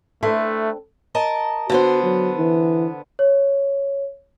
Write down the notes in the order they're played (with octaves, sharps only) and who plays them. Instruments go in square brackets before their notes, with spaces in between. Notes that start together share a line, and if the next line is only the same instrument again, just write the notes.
[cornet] A3 [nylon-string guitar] C4 D4 A4 [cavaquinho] E4 B4 C6
[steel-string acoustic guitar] A#4 D#5 A5
[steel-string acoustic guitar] D3 B3 C5 [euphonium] F#4
[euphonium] F#3
E3
[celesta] C#5